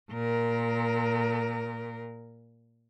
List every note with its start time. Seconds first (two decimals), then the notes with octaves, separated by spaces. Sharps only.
0.12 A#2 A#4